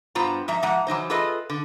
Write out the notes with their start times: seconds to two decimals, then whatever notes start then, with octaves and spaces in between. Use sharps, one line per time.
0.15 G2 B3 F4 C5 A#5
0.48 G#2 F3 E5 A#5
0.63 G#2 F3 F#5 A#5
0.87 E3 F#3 D#4 C5
1.10 F4 G#4 A4 B4 D#5
1.50 D3